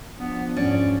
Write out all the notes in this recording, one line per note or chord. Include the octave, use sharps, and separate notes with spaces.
F3 B3 D4
E2 G#2 C#4 D5